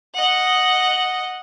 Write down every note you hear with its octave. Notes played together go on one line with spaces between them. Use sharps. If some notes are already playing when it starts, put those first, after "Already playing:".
D#5 F#5